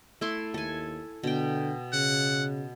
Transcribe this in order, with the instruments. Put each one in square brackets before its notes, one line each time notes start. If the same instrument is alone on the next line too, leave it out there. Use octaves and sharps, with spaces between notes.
[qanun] A3 E4 C6
[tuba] D#2 [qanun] A4 G#5
[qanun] B2 G5 [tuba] D3
[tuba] C#3 [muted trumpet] F#5